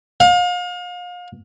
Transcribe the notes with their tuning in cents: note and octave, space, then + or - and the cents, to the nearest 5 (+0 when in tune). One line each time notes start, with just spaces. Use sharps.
F5 +35